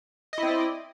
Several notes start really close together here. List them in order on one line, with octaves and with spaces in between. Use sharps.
D#5 E4 C4 D5